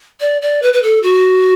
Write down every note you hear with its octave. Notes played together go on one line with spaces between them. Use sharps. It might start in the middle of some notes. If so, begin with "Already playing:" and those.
D5
D5
B4
B4
A4
F#4